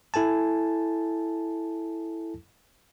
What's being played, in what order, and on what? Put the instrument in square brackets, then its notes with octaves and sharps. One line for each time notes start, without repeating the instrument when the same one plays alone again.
[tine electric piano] E4 A4 G#5 A5